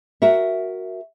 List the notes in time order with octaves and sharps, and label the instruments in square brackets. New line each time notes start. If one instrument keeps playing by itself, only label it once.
[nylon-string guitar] F#4 A#4 E5